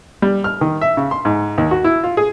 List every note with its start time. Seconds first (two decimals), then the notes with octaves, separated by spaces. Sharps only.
0.22 G3
0.44 F6
0.61 D#3
0.81 E5
0.97 C#3
1.11 C6
1.25 G#2
1.58 D#2
1.71 F#4
1.84 E4
2.03 F4
2.17 G#4